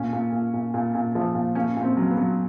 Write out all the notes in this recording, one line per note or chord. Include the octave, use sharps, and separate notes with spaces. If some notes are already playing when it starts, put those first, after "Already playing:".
Already playing: A#2 C#4
A#2
A#2
A#2
A#2
A#2
F3
A#2
A#2 C#4
A#2
C4
F#3
B3
F#3